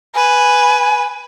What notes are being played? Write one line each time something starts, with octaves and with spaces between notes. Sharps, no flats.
B4 G#5